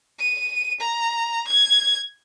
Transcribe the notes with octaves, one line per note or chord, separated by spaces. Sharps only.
D#7
A#5
G#6